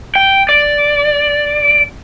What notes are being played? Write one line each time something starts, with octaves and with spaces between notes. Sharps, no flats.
G5
D5